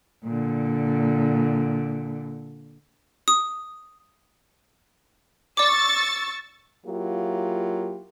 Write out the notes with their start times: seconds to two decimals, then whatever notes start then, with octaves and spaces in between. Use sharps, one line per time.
0.24 A#2 D3
3.28 D#6
5.57 D5 C#6 D6 E6 A6
6.86 F#3 A#3 E4 F4 G4